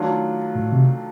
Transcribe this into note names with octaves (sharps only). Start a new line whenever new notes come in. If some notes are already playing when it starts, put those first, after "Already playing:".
Already playing: D#3 F#3 A3 D4 F4
A2
C3